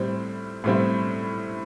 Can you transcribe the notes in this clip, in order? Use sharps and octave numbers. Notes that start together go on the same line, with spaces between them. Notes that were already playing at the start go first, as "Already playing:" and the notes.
Already playing: A2 G3 C4 E4
A2 G3 C4 E4